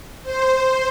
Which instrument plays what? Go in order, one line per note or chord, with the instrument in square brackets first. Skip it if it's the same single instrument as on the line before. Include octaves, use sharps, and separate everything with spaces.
[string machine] C5